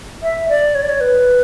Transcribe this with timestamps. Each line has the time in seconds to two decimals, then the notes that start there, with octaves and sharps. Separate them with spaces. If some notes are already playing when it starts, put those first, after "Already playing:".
0.23 E5
0.49 D5
0.75 C#5
0.82 D5
0.89 C#5
1.01 B4